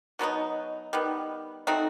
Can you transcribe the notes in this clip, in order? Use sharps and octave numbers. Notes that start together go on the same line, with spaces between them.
B2 F#3 B3 D#4
D#3 G3 B3
A3 C4 D#4 F#4